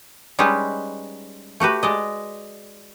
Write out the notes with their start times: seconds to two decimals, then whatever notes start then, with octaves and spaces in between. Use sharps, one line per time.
0.39 G3 G#3 C#4 D#4 B4
1.60 A3 F#4 G4 B4
1.83 G#3 D5 D#5